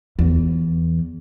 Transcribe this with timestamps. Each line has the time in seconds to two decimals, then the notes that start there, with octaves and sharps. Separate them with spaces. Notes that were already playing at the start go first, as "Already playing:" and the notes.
0.19 E2